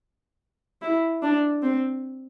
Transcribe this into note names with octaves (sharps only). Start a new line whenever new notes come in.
E4
D4
C4